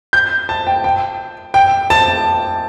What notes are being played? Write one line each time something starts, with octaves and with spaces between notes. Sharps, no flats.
G6
A5
G5
G5
G5
A5